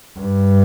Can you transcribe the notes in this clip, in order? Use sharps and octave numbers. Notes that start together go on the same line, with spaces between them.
G2